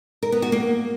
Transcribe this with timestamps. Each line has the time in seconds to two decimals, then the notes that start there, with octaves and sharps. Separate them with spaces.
0.23 A#4
0.32 B3
0.42 F#4
0.52 A#3